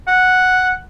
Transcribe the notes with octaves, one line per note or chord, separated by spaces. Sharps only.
F#5